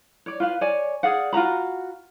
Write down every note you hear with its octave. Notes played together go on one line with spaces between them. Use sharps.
C#5 D5
F4 B4 F5
C#5 D5 G#5
G#4 D5 F5 F#5
F4 F#4 A#5 B5